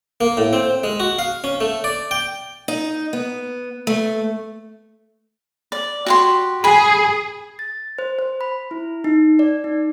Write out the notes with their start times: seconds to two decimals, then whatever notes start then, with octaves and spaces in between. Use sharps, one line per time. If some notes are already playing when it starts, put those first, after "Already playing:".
0.21 A#3
0.37 A2
0.53 C4
0.83 G#3
1.00 F#4
1.19 F5
1.44 C#4
1.60 A3
1.84 D5
2.11 G5
2.68 D#4
3.13 B3
3.87 A3
5.72 D5
6.06 F#4 G4 C6
6.64 G#4 G#5 B5
7.59 A6
7.99 C5
8.19 C5
8.41 B5
8.71 E4
9.04 D#4
9.39 D5
9.64 D#4